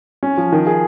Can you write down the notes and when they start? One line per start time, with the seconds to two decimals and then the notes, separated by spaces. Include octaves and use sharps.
0.23 C#4
0.38 F3
0.52 D#3
0.67 G#4